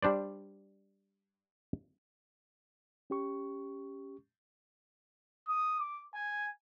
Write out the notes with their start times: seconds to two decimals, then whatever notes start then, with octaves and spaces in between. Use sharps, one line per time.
0.03 G3 D4 C5 D5
3.10 C#4 G4 C#6
5.48 D#6
5.80 D6
6.15 G#5